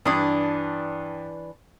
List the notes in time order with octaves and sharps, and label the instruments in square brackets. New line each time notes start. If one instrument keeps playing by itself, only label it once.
[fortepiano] G2 D#6 [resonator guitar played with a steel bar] E3 D4 D5